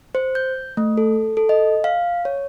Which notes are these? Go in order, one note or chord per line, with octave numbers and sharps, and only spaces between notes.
C5
G6
A3
A4
A4
D#5
F5
C#5